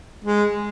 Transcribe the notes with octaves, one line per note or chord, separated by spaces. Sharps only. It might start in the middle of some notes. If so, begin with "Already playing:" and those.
G#3